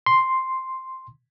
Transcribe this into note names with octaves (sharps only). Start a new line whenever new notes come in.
C6